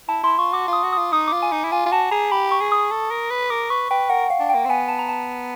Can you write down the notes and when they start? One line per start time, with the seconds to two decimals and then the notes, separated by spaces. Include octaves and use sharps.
0.08 E4 A5
0.23 E4 C6
0.38 F4 C#6
0.53 F#4 D6
0.68 F4 D#6
0.83 F#4
0.93 D#6
0.98 F4
1.12 D#4 D#6
1.28 D6
1.33 F4
1.42 G#5
1.52 D#4
1.64 E4
1.71 F4 G#5
1.86 F4
1.92 F#4 A5
2.11 G#4 A#5
2.31 G4 B5
2.51 C#6
2.61 G#4
2.72 D#6
2.91 A4
3.11 A#4
3.31 B4
3.50 A#4 D6
3.70 B4 C#6
3.90 B4 G5
4.10 A#4 F#5
4.30 F5
4.40 D4
4.50 G5
4.55 A#3
4.65 C4
4.69 B3 G#5
4.89 A5
4.99 A#5
5.09 A5